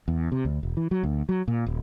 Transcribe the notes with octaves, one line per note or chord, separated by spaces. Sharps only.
E2
C3
D2
E1
E3
F#3
D2
F#3
A#2
D#1